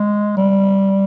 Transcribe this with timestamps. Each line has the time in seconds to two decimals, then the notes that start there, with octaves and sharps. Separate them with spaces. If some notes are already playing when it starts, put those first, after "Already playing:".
Already playing: G#3
0.37 G3